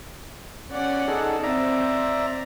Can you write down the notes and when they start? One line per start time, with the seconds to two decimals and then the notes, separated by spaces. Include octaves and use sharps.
0.72 C#4 D5 F#5
1.08 D#4 G#4 A4
1.44 C4 D5 E5 A#5